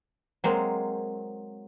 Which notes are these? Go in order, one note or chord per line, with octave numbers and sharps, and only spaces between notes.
F#3 G#3 A#3 C4